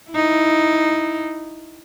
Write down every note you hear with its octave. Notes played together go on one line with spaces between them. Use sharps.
D#4 E4